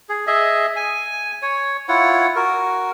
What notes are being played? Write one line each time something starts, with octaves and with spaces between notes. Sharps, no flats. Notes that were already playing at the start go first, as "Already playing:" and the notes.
G#4
G#4 D#5 E5
G#5
C#5
E4 F4 C#5 F#5
F#4 A#4